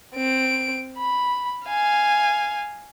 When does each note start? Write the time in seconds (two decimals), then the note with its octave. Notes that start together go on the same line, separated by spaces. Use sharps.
0.16 C4 D7
0.98 B5
1.67 F5 G#5